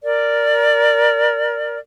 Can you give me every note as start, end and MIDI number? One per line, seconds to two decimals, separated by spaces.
0.02 1.78 70
0.02 1.78 74